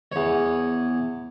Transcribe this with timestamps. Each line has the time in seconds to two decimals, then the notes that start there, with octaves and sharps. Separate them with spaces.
0.12 E2 C#5